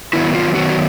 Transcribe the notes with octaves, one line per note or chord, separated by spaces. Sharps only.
D#3 F#3 B3 E4
F4
D#3 F#3 B3 F#4
F#4